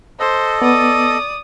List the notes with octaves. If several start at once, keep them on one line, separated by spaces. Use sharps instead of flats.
A4 C5 D#5
B3 D5 D#6